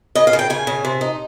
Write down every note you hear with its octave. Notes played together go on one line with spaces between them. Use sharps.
C#3 D#5
F5
C#3
G5
C#3 G#5
C#3
C3
D#4